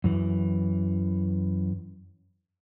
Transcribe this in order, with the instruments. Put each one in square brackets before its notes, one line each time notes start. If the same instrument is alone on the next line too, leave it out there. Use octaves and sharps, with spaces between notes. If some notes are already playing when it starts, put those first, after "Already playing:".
[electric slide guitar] F#2 E3